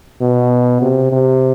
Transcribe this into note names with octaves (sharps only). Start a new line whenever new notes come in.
B2
C3
C3